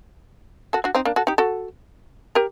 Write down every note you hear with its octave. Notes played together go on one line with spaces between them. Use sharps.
F#4 A4
D4 F#4
C4 D#4
A#3 D4
F#4 A4
D#4 G4
F#4 A4
G4 A#4